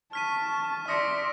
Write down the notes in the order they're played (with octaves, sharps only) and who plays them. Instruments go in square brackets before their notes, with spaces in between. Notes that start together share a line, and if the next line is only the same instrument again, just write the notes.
[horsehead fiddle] A5 [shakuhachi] C#6 [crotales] F6 B6 D#7
[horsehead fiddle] D5 E5 [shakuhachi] C6 [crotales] D#6 A#6 C#7